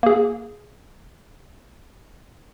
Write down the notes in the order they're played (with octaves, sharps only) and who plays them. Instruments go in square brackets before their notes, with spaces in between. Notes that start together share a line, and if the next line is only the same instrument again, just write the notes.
[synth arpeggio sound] A#3 G#4